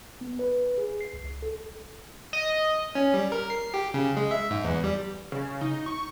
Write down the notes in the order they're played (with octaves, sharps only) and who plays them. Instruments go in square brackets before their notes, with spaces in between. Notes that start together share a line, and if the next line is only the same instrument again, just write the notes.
[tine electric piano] B3
B4
G#4
C7
C#2
A4
[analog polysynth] D#5
[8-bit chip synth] C#4
G3
A#4
C7
G4
C#3
G#3
E5
G#2
E2
G3
[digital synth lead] C#3
D#4
C#6